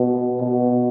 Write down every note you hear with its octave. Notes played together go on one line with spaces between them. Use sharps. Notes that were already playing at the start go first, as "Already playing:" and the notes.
Already playing: B2
B2